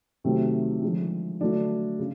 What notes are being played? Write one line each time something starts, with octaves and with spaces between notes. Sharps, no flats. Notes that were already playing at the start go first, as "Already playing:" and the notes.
C3 D#3 F#3 A3 C4
D3 F3 G#3
D3 F#3 A3 D4
C#3